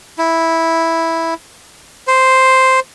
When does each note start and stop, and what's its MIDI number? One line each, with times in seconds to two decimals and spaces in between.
0.18 1.34 64
2.07 2.80 72